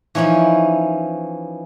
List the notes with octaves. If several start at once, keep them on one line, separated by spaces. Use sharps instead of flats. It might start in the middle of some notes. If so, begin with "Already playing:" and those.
E3 F3 C#4 D#4 E4